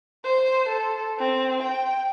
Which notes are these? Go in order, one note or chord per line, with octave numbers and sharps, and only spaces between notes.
C5
A4
C4
G5